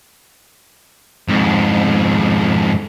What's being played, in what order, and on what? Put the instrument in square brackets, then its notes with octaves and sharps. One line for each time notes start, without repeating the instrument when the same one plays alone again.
[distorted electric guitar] F2 G#2